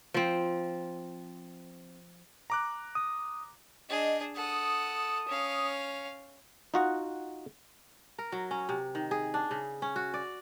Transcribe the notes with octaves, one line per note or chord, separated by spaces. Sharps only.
F3 C4
A#5 D6 F#6
D#6
D4 G#4 D#5
A4 F#5 D#6
C#4 F5
D#4 F4 F#4 D#5 F#5
A#4
F#3
C#4
C3
D#3
G#4
D4
C#3
C#4
F#4
D5